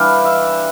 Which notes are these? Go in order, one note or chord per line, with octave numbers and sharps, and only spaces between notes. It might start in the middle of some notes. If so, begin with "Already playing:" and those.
Already playing: E3 G3 D4 F5
E5